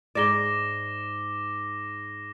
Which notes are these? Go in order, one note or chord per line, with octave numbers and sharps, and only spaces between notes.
G#2 D5 D6 A#6 G7